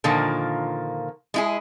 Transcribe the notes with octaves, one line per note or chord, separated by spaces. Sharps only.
A#2 D3 D#3 F3 A#3
G#3 E4 G#4